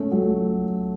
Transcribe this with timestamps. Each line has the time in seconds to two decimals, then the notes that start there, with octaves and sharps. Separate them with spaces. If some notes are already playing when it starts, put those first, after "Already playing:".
Already playing: A3 C#4
0.11 F#3 A3